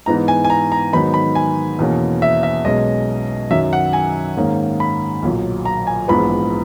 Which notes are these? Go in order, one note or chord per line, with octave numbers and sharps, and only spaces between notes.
G#2 E3 B3 D#4 A#5
G#5
G#5
A#5
A#5
G#2 D#3 F#3 B3 D#4 B5
B5
G#5
E2 B2 A#3 C#4
E5
E5
B1 B2 G#3 C#4 D#5
F#2 D#3 F#3 E5
F#5
G#5
G#2 D#3 A#3 C#4
B5
B1 A#2 F#3
A#5
G#5
A#1 G#2 E3 B3 B5